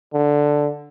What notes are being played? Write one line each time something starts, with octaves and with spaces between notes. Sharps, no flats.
D3